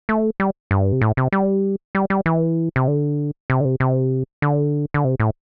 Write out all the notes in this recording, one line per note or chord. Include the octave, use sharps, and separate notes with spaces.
A3
G3
G2
C3
A2
C3
G3
G3
G3
E3
C3
D3
C3
D3
C3
C3
D3
D3
C3
A2